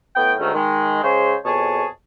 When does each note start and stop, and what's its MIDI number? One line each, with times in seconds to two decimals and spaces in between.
0.16 0.33 45
0.16 0.33 59
0.16 0.33 79
0.39 0.53 38
0.39 0.53 44
0.39 0.53 51
0.39 0.53 57
0.39 0.53 61
0.53 1.01 51
0.53 1.01 56
1.03 1.34 49
1.03 1.34 56
1.03 1.34 72
1.03 1.34 73
1.45 1.84 41
1.45 1.84 47
1.45 1.84 68
1.45 1.84 73
1.45 1.84 81